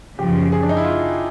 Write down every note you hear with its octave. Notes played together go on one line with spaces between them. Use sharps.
F#2 C#3 F3 G4
G#4
D4
D#4
E4
F4